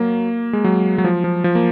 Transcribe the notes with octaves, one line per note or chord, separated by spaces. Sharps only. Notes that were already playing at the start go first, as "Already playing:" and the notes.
Already playing: F#3 A#3
G#3
F#3
F#3
F3
F3
F3
A#3